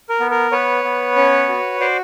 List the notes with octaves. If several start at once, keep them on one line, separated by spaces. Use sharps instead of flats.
A#4
B3
A#4
B3 B4 C#5
B3
C#4
F#4
F#4 C5 D5